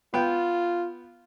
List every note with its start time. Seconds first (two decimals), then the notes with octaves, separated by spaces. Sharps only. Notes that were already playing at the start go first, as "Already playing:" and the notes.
0.14 B3 F4 G5